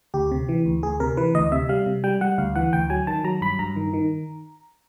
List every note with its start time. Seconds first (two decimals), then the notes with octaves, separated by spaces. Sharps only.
0.14 D2 G4
0.31 C3
0.49 E3
0.66 D2
0.83 D2 G#4
1.00 C3 A#4
1.17 E3 B4
1.35 D2 D#5
1.52 C3 E5
1.69 G3 F5
1.86 C3
2.04 G3 G5
2.21 G3 F#5
2.38 D2 F5
2.56 E3 F#5
2.73 D2 G5
2.90 F#3 G#5
3.07 D#3 A5
3.24 F#3 A#5
3.41 G2 B5
3.59 G2 A#5
3.76 D#3
3.93 D#3